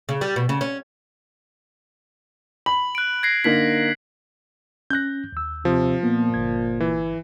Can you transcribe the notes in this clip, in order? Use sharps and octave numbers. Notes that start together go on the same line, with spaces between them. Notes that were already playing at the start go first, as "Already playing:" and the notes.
C#3
G3
B2
C#3
C#4
B5 F#7
F#6 D7
G#6 A#6 C7
D3 A#3 D#4 B6 F#7
C#4 F#6 G6 A#6
D#2 E6
C3 F3
A#2 A#3 B3
G1 G#6
E3